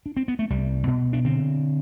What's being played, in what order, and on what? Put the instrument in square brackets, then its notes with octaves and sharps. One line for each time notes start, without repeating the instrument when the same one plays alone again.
[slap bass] D4
C4
B3
A3
C2 G3
B2 B3
D4
D3 C4